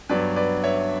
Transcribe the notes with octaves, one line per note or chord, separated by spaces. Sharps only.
G2 F#3 B3 B4 D5
B4 D5
C#5 E5